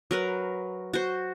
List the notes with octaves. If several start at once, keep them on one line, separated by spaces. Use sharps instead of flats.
F#3 A#4 B4
F#4 C5